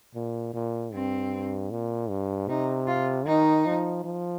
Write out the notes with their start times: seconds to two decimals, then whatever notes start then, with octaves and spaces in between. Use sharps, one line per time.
0.15 A#2
0.54 A#2
0.93 G2 C4
1.71 A#2
2.09 G2
2.49 C3 D#4
2.87 F4
3.27 D#3 D#4
3.66 F3
4.04 F3